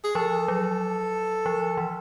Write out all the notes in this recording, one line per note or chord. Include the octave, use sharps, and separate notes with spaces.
G#4
F3 A4
F#3
F3
E3